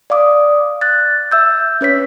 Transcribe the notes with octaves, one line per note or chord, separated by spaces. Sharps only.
D5 F5 D6 D#6
F#6 A6
E5 E6 G6
C#4 B4 C#5 B6